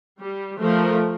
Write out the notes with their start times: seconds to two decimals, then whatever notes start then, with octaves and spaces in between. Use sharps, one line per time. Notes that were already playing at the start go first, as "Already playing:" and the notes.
0.20 G3
0.58 F3 A3 A#4